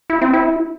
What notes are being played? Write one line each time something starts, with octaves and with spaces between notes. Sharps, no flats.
E4
C4
E4